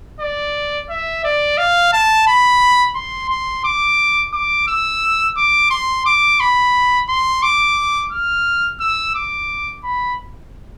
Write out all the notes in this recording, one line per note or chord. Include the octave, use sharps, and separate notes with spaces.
D5
E5
D5
F5
A5
B5
C6
C6
D6
D6
E6
D6
C6
D6
B5
C6
D6
F6
E6
D6
B5